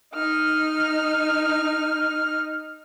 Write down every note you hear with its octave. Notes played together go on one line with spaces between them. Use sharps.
D#4 F6